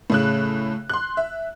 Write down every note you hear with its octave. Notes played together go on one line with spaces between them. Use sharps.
A2 C#3 F#6
C6 F#6
E5